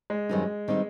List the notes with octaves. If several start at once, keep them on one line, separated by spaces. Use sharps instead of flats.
G#3
F#2 D#3 G3 C4 D#4
D#3 G3 C4 D#4